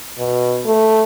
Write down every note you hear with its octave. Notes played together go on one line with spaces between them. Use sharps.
B2
A3